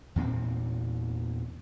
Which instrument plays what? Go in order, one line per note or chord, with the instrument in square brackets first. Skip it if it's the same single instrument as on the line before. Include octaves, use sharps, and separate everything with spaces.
[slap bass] E2 A#2 B3 C4